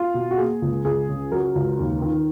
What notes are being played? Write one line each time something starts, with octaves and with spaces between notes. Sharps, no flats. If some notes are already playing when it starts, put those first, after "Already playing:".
Already playing: F4
B2
F#4
A#3 G#4
C#2
C#2 G#4
C#3
F#3 A#4
C#2
D#2
D#3